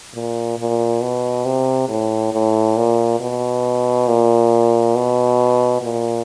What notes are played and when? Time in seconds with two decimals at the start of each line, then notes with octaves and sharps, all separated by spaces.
0.14 A#2
0.58 A#2
1.01 B2
1.45 C3
1.89 A2
2.32 A2
2.77 A#2
3.20 B2
4.08 A#2
4.95 B2
5.82 A#2